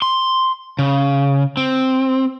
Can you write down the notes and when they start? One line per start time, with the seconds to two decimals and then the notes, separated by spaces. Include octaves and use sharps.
0.02 C6
0.79 C#3
1.57 C4